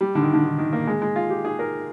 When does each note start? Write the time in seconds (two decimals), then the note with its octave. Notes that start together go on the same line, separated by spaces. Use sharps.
0.01 G3
0.15 D3
0.22 D#3
0.33 D3
0.44 D#3
0.58 D#3
0.73 A#3
0.87 G#3
1.02 G#3
1.16 F4
1.30 G4
1.45 G#4
1.59 A#4